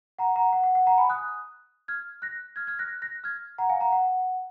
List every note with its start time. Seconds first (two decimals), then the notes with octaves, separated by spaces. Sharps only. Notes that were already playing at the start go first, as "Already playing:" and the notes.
0.19 F#5 A#5
0.36 F#5 A#5
0.53 F#5
0.63 F#5
0.75 F#5
0.87 F#5 A#5
0.98 G#5 B5
1.10 D#6 F#6
1.88 F6 G#6
2.22 F#6 A#6
2.56 F6 G#6
2.67 F6 G#6
2.79 F#6 A#6
3.02 F#6 A#6
3.24 F6 G#6
3.58 F#5 A#5
3.69 F5 G#5
3.81 F#5 A#5
3.92 F#5